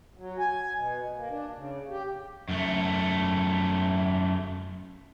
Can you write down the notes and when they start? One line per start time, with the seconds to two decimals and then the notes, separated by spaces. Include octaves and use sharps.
0.18 F#3
0.39 G#5
0.75 B2
1.16 A#3
1.30 D4
1.55 C#3
1.89 G4
2.49 F#2 A3